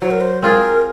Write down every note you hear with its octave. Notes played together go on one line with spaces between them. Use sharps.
F#3 C5
A#4
C5
C4 F4 G#4 A#4